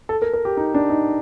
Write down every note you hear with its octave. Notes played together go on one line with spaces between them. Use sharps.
A4
A#4
A#4
G4
D#4
D4
D#4